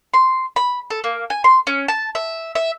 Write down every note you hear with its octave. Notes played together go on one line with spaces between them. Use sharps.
C6
B5
A4
A#3
G#5
C6
C#4
A5
E5
E5